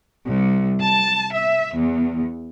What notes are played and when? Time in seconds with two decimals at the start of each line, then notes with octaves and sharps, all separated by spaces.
0.25 C2
0.84 A5
1.33 E5
1.77 E2